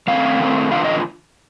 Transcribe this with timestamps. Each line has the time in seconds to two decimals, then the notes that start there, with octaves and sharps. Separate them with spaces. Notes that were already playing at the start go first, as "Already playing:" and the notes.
0.07 D#3 A3 C4 F5
0.39 D#3 A3 C4
0.71 D#3 G3 D4 F4 F5
0.84 D#5